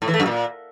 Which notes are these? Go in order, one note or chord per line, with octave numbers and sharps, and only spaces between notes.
A2
E3
A3
F#2
A#2